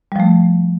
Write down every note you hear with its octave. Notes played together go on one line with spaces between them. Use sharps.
F3 G3 A3